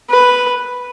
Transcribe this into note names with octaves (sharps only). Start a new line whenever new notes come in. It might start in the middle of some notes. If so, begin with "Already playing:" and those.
B4